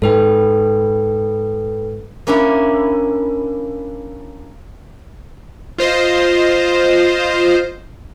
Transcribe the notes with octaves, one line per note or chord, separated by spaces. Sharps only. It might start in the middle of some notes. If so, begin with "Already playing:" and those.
G#2 A4 B4 G5
A#3 C#4 D4 E4
F4 C5 D#5